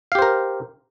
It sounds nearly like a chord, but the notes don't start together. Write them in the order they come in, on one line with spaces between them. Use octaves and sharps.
F5 G4 C5 A#4